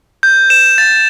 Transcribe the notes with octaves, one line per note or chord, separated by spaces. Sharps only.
G6
E7
A6